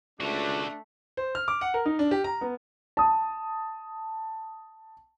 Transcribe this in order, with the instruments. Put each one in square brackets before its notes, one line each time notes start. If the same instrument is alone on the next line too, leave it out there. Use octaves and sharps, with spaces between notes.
[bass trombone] C#2 [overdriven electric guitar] D3 F#4 [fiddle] A3 [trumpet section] D4
[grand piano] C5
F6
D6
F#5
A#4
D#4
D4
G4
A#5
B3
A5 D#6